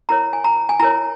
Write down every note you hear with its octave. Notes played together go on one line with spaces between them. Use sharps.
E4 A#4 C#5 A#5
G#5
A#5
G#5
E4 A#4 C#5 A#5